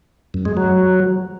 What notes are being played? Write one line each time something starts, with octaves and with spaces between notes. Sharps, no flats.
F#2
G#3
F#3